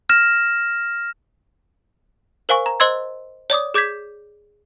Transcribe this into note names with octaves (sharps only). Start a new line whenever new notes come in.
F6 A#6 E7
A#4 C5 F5 G#5 C#6
A#5
C5 D#5 C6 E6 G#6
C#5 D5 D6 D#6
G#4 D6 G6 G#6 B6